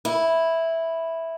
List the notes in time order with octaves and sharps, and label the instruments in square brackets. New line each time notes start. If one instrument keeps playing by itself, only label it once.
[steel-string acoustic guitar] E4